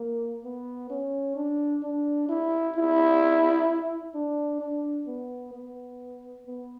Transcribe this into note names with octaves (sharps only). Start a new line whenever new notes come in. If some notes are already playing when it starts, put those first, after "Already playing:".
Already playing: A#3
B3
C#4
D4
D4
E4
E4
D4
D4
B3
B3
B3